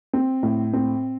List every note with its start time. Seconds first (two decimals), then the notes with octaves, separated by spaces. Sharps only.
0.13 C4
0.43 A2
0.73 C4